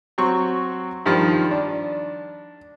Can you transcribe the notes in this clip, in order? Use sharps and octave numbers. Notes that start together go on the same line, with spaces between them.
F#3 C4 C#6
G2 D#3 F3
D4